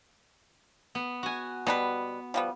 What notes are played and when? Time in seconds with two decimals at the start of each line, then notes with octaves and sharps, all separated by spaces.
0.95 B3
1.23 F#4 G#5
1.67 B2 G3 B3 B4
2.34 F3 G3 B3